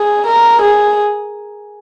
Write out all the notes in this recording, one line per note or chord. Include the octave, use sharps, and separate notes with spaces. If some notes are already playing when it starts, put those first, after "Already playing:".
Already playing: G#4
A#4
G#4